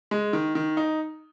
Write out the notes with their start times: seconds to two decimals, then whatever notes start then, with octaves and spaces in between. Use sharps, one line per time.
0.11 G#3
0.33 D#3
0.55 D#3
0.77 D#4